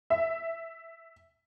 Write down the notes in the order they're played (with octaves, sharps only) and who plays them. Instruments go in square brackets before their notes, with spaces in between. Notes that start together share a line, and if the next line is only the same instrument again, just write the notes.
[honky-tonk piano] E5